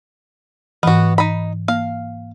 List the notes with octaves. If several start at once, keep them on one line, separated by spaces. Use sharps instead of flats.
G#2 E3 B3 F#4
D#4 B5
A#3 F5